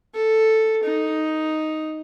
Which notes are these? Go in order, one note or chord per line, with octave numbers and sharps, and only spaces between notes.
A4
D#4